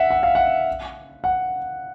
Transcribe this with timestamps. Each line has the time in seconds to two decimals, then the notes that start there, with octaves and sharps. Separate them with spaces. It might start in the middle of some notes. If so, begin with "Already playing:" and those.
Already playing: E5 F#5
0.11 F#5
0.23 F5
0.35 F#5
1.24 F#5